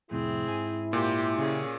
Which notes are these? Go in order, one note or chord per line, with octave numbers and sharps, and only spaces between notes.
F2 A2 C3 C4 E4 G#4
G#2 G#5
A#2 G4 C5
C#3 C#4 G4 G#4